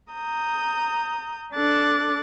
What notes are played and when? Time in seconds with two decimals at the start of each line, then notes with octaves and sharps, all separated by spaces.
0.12 A#5 D#6 G6
1.54 D4 A4 D6 F#6 A6